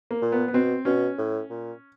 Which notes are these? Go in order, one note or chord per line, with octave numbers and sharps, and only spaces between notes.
A#3
A#2
B3
B3
B2 C4
B2 C#4
A2
A#2